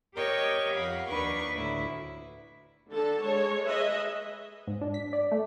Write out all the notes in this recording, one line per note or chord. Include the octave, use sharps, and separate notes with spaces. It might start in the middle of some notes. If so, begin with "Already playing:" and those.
G4 A#4 C#5 D#5 G5 C#6
F2 F5 F#5 B5
D#2 D4 D#4 B4 C#6 D6
D2 A2 E4
D3 A4 A5
G#3 C#5
G#4 B4 D#5 E5
G#2
D4
B6
D5
A3